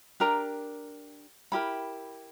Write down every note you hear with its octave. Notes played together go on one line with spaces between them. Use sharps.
D4 G4 A#4 A#5
C#4 E4 G4 A#4 B5